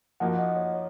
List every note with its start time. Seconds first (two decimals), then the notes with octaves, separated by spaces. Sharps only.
0.20 F3 A#3 D#4 F#4 F#5
0.39 D#5
0.56 C#5
0.74 C#5